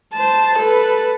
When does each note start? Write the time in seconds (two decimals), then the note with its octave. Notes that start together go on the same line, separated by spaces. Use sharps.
0.13 C5 A5
0.59 A4 B4